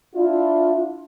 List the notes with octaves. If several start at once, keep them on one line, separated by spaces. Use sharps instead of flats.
D4 E4 F4